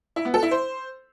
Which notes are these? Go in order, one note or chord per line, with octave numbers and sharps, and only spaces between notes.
E4
B3
A4
E4
C5